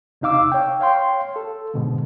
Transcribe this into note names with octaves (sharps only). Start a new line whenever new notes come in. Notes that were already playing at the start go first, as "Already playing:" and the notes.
E2 C3 D#4 F5 D6 E6
C#5 G5
C#5 F5 G5 C6
A4
G#2 B2 D3